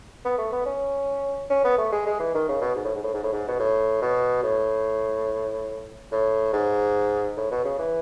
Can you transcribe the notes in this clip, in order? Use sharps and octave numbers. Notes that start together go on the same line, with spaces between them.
B3
A3
B3
C#4
C#4
B3
A3
G#3
G#3
E3
D#3
C#3
B2
G#2
A2
G#2
A2
G#2
A2
G#2
B2
A2
B2
A2
A2
G#2
A2
B2
C#3
E3